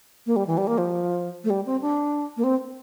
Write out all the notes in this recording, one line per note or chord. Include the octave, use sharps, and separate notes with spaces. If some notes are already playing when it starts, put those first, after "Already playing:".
A#3
G3
E3
G3
A#3
F3
A3
G3
C4
D4
A#3
C4